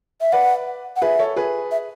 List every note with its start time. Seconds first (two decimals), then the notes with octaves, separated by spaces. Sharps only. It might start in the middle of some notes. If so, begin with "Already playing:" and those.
0.21 E5
0.33 B4 D5 F#5
0.96 F#5
1.02 G#4 B4 E5
1.19 A4 C#5
1.36 G#4 B4
1.71 E5